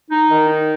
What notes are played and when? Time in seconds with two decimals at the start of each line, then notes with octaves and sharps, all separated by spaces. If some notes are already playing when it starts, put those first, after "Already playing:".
0.10 D#4
0.29 D#3
0.49 D#4